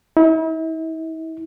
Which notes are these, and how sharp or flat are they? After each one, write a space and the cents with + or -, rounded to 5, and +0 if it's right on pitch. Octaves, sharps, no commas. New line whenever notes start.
E4 -45